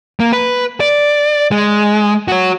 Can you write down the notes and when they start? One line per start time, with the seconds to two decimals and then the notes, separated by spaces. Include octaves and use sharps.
0.20 A#3
0.33 B4
0.80 D5
1.51 G#3
2.28 F#4 C#5